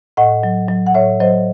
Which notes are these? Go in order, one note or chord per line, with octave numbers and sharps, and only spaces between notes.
A2 D#5 F#5
F#3
F#3
F#5
A2 C#5 E5
F#3 C5 D#5